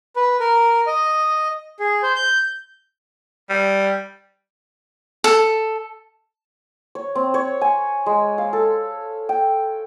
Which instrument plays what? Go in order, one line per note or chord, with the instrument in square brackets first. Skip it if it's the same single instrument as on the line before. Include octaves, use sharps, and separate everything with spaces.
[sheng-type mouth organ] B4
A#4
D#5
G#4
C5
G6
[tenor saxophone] G3
[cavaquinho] A4
[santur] C#5
C4
C#5
G#5
G#3
F5
A4
G5